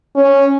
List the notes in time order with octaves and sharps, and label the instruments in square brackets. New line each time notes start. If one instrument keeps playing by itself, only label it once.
[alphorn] C#4